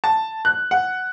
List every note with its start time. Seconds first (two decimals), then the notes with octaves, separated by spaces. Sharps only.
0.04 A5
0.45 F#6
0.71 F#5